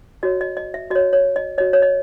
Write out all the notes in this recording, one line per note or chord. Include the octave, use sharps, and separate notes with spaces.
F#4 C#5 D#5
D#5
D#5
E5
F#4 C#5 D#5
C#5
D#5
F#4 C#5 D#5
C#5
D#5